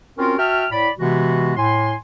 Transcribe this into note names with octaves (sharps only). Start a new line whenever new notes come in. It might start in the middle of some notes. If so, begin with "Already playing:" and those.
C4 C#4 F4 F#4 A#4
F#4 E5 G5 A5 F6
A2 D5 B5
C3 E3 G#3 B3 F#4
A2 G#5 C6